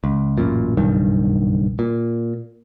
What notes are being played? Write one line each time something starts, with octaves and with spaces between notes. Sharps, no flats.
C#2
A1 F#2 A#2
F#1 B1 G2 D#3
A#2